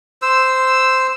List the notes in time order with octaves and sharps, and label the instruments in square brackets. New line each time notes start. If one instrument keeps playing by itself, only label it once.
[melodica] C5 E6